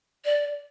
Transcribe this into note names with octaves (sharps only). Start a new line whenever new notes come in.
D5